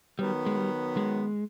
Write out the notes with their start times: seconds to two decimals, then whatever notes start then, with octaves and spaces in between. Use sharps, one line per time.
0.19 D#3 F#3 G3 B3
0.46 G#3
0.57 G3
0.97 G#3